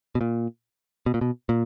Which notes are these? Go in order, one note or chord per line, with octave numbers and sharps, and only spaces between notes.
B2
A#2
B2
A#2
B2
A#2